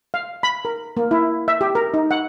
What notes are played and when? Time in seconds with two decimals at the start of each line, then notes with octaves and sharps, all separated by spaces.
0.14 F5
0.43 B5
0.65 A#4
0.97 A#3
1.11 E4
1.48 E5
1.61 G4
1.75 A#4
1.94 D#4
2.11 F#5